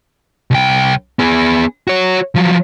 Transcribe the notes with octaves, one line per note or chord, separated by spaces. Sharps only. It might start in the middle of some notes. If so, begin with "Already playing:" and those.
C2 G5
B3 G#4
F#4 C#5
F3 F#3